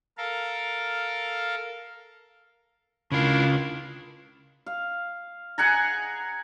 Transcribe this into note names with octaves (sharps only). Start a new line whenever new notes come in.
A4 A#4 F5
C#3 D4 E4 F4 A#4
F5
G#4 F#5 G#5 A#5